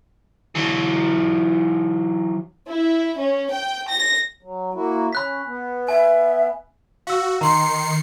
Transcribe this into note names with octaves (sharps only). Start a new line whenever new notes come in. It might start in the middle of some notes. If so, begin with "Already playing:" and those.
E3 F#3
E4
C#4
G5
A#6
F#3
A#3 E4 F#4
C#4 B5 F#6 B6
B3
E5 G#5
F#4 F5 E6
D#3 A#5 C6 C7 C#7